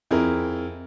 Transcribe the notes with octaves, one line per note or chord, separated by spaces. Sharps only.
F2 E4 G#4 A#4